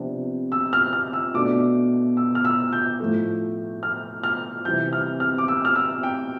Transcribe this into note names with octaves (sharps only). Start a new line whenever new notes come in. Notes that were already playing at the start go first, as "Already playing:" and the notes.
Already playing: C3 F3 B3 D4
E6
F6
F6
E6
B2 A3 D4 D6
E6
F6
E6
G6
A2 F3 A3
F6
F6
C3 E3 G3 G6
F6
F6
D6
E6
F6
E6
G5